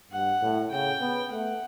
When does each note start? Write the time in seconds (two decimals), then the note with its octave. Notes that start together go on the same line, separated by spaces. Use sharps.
0.11 G2 F#5
0.42 A2
0.71 C#3 G5
1.01 B3
1.30 A3 F#5